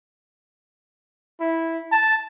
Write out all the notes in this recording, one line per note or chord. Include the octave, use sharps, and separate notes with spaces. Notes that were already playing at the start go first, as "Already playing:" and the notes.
E4
A5